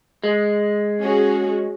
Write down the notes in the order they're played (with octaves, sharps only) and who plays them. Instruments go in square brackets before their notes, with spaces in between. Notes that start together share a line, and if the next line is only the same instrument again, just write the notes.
[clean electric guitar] G#3
[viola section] C#4 F#4 G#4